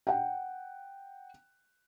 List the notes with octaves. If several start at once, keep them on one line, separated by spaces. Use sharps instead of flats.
F#5 G5